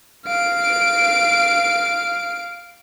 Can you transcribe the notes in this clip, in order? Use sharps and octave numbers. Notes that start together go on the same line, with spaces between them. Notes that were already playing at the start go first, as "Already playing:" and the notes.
F5 D7